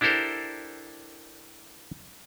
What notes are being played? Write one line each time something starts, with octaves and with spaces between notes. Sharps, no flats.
D4 E4 G4 A4 A#4 C5